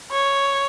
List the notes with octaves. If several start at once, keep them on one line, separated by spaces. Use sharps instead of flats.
C#5